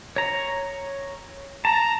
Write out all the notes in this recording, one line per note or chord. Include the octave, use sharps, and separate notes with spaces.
C#5 A#5
A5 A#5